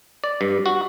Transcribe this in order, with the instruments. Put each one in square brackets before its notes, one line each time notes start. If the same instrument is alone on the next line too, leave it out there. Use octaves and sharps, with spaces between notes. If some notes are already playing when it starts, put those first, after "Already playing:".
[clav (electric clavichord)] D5
G2
F#4